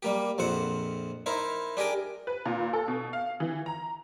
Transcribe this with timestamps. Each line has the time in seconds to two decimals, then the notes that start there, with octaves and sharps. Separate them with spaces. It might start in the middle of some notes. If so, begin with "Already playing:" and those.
0.03 G3 A#3 G4
0.38 A#1 F2 C5 F#5
1.26 D#4 E4 A#4 C5
1.77 D4 G4 G#4 A#4 G5
2.27 B4
2.46 A#2
2.73 A4
2.88 B2
3.13 F5
3.40 E3
3.66 A#5